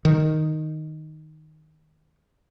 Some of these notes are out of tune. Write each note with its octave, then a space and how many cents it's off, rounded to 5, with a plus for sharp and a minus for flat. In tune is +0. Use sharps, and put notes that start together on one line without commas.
D#3 -5